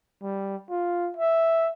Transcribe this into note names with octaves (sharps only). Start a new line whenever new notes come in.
G3
F4
E5